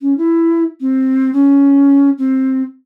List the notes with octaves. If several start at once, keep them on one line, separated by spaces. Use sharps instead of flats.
C#4
E4
C4
C#4
C4